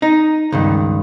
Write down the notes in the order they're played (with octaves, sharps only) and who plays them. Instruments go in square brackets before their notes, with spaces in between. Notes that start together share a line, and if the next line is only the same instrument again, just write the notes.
[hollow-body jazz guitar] D#4
C#2 G2 D#3